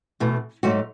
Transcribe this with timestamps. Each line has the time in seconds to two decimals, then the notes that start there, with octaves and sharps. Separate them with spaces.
0.20 E2 B2 A3
0.63 G#2 F#3 A3 F#4